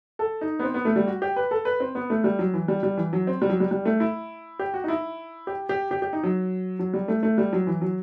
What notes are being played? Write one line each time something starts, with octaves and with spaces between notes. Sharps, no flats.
A4
D#4
B3
C4
B3
A3
G3
F#4
G4
B4
A4
B4
C4
B3
A3
G3
F#3
E3
G3
G3
E3
F#3
C4
G3
F#3
G3
G3
A3
E4
G4
F#4
D#4
E4
G4
G4
G4
G4
D#4
F#3
F#3
G3
A3
A3
G3
F#3
E3
F#3